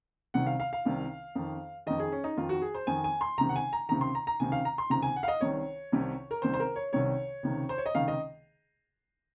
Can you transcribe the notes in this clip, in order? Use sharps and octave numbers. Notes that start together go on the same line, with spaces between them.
C2 C3 D#3 F#5
F5
F5
F5
C2 C3 D#3
F2 D#3
F2 D#3 D#5
G#4
C#4
D#4
F2 D#3 F4
F#4
G#4
C5
F2 D#3 G#5
G#5
C6
C#2 C3 D#3 A#5
F#5
G#5
A#5
C#2 C3 D#3 A#5
C6
A#5
A#5
C#2 C3 D#3 G#5
F5
A#5
C6
C#2 C3 D#3 A#5
G#5
F#5
F5
D#5
C2 C3 D#3 C#5
C2 C3 D#3
A#4
C2 C3 D#3 C5
C5
A#4
C#5
C2 C3 D#3 C#5
C#2 C3 D#3
C5
C#5
D#5
C#2 C3 D#3 F5
D#5